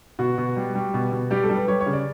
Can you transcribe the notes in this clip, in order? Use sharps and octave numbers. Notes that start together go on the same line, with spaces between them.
B2 F#4
B2
G3
G3
B2
B2
G3 G4
A4
G3
B4
G3 C#5
C#5
C#3
D5